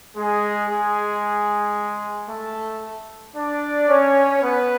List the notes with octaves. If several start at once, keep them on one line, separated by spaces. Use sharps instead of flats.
G#3 G#4
G#3 G#4
A3 A4
D4 D5
C#4 C#5
B3 B4